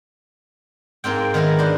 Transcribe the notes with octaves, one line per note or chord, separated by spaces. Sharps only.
G#2 A#3 C4 G5
D#3 B3 D#4 E4 A#4
D4 C5 D#5